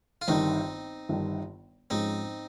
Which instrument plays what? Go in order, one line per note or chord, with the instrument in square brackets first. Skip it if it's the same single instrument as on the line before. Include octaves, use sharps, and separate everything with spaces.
[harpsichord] F4
[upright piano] G1 G2 D#3 [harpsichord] C4 D#4
[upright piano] G1 G2 D#3
[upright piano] G#2 F3 G#3 C#4 G#4 [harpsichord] C4 D#4